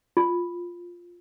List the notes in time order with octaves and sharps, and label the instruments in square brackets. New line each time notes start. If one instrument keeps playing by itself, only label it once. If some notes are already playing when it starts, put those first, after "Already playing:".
[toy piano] F4